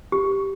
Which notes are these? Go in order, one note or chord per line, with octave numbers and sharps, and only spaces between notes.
G4